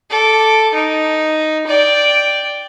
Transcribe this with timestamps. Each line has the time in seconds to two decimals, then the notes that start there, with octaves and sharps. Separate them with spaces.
0.10 A4 D6
0.74 D#4
1.67 D5 G5